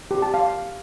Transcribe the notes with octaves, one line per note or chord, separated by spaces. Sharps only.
G4
A5
F5